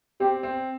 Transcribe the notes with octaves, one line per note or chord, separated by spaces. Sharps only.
C4 G4
C4